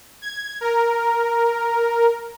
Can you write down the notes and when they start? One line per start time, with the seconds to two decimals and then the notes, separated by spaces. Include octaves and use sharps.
0.22 G#6
0.61 A#4